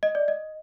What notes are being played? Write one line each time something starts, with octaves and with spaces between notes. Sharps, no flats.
D#5
D5
D#5